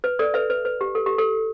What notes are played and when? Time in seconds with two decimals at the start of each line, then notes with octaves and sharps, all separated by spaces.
0.04 B4
0.19 A4 D5
0.34 B4 E5
0.50 B4
0.65 B4
0.81 G4
0.95 A4
1.06 G4
1.18 A4